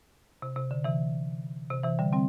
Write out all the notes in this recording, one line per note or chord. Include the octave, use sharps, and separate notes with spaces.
C3
C3
D3
C3 E3
C3
C3 E3
D3 G3
G3 C4